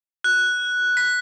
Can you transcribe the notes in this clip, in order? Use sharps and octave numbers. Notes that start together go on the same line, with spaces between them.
F#6
B6